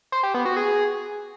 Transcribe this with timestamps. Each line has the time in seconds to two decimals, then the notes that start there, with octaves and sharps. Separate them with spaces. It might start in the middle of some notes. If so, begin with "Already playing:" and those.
0.12 C5
0.23 G4
0.34 B3
0.45 F#4
0.57 G#4